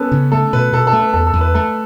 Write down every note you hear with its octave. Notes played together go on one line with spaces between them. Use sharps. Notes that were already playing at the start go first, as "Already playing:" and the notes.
Already playing: B3 C#4 A4 B4
C#3
A3 A4
B2 B4
B2 A4
A4
A3
B4
E2 A4
A4
E2
B4
A3 A4